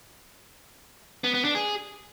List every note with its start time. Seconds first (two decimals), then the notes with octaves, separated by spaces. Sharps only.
1.24 B3
1.34 B3
1.45 D4
1.55 G#4